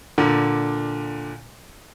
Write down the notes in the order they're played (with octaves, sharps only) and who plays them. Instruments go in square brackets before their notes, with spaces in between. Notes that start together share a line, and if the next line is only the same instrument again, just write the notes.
[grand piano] A#2 D3